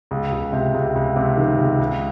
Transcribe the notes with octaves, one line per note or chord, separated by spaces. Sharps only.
C#2
C#2
C3
C#2
C#2
C3
D#3
C#2
C#2